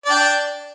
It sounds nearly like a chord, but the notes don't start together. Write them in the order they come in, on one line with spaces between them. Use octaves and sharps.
D5 D4 G5